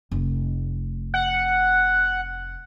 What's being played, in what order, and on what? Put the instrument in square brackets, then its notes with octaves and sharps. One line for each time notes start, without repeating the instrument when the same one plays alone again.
[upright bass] F1
[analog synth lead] F#5